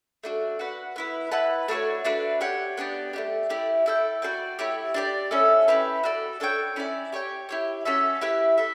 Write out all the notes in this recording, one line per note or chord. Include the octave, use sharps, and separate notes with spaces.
A3 D4 F#4
F#4 B4 F#5
B3 E4 B4
E4 B4 F#5 A5
A3 D4 F#4 C#5
A3 D4 F#4 B4
G4 C#5 F#5
B3 D4 G4 D5
A3 D4 G4
A3 E4 G4 D5
E4 A4 E5 G5
F#4 A4 D5 G5
A3 E4 G4 C#5
D4 G4 D5
A3 C#4 E4 A4
C#4 E4 G4 B4
F#4 A4 D5
D4 A4 C#5 G5
C#4 E4 A4 D5
G4 C#5 G5
E4 G4 C#5
C#4 F#4 A4 E5
E4 G4 B4 E5
A4 E5